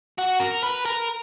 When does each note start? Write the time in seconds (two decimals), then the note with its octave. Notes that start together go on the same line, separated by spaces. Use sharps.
0.19 F#4
0.40 A#4
0.64 B4
0.86 A#4